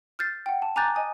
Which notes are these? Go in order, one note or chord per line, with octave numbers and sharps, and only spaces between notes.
F6 G6 A6 C7
F#5 G5
A5
G#5 A#5 D6 F#6 G6 A6
D#5 G#5 D#6